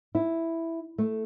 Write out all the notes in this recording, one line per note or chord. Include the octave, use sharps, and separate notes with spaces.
E4
A3